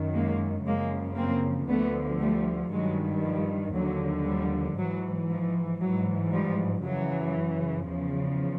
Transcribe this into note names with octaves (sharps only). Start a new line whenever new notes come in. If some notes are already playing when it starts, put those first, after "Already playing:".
Already playing: F#2 D#3
G#3 A#3
F#2 C#3 F3 G#3 A#3
A#3 C4
D2 D3 F3 A3 B3
G3 A3
G2 D#3 F#3 G#3
F3 G3
D#2 D3 F3 F#3
F3 G3
G#2 E3 F#3
F3
G#2 E3 F#3
F3 G3
F#2 C#3 E3 F#3
E2 C#3 F3